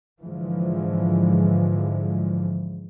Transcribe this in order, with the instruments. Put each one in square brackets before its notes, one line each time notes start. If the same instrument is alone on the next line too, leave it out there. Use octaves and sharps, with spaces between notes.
[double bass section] G#2 D3 E3 F3 G#3